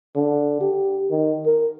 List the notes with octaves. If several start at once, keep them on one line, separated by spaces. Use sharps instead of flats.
D3
G4
D#3
A#4